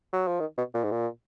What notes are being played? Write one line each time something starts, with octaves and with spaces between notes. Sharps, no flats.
F#3
F3
D#3
B2
A#2
G#2
A#2